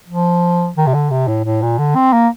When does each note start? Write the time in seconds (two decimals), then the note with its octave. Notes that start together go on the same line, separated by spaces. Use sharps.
0.09 F3
0.77 D#3
0.87 C3
0.94 D3
1.10 C3
1.28 A2
1.45 A2
1.62 A#2
1.79 D3
1.95 C4
2.13 A#3